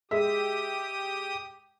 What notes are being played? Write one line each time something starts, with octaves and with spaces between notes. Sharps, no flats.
G#3 G4 E5 D#6